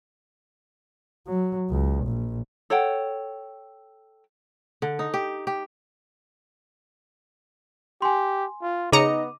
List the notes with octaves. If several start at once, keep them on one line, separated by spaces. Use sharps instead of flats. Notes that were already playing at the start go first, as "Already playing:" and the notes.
F#3
C#2
A#1
A4 C#5 F#5 G5
D3
D#4
G4
G4
G4 G#5 C6
F4
C#3 B3 D#4 D#5 A#5 D6 C#7 D#7